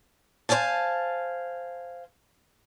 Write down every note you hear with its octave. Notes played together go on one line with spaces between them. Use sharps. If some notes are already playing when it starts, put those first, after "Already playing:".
C5 D5 F5 G#5 A5